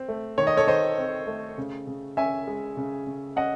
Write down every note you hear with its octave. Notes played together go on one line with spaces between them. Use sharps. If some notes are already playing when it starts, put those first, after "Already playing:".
Already playing: C4
A3
D#3 C#5
D#5
A4 C#5
D#3 C5 D#5
C4
A3
C#3
C#3
C#4 E5 G#5
G#3
C#3
C#3
C#4 D#5 F#5